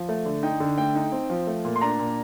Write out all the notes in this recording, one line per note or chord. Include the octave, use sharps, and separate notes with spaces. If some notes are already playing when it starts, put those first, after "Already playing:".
Already playing: F3
A3
D3
D#4 G5
D3
A3 G5
D#4
C4
F3
A3
A#2
C6
D4 A#5
A#2